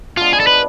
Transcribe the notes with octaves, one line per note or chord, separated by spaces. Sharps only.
F3 G#3 B3 D4 F4
G#4
A4
B4